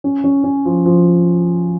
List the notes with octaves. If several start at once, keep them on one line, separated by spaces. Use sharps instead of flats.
C#4
C#4
C#4
F3
F3